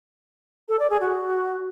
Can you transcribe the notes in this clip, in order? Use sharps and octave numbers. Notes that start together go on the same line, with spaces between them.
A4
D5
G#4
F#4